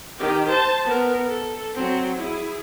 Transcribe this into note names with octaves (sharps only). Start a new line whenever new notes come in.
D#3 G4
C5 A5
B3 A#4
A4
F#3 C4
E4 G#4